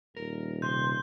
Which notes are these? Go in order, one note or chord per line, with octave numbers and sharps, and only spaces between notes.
D#1 A#4
C3 C6 G6